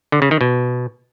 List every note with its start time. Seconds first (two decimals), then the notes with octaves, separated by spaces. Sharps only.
0.12 D3
0.22 C#3
0.31 D#3
0.41 B2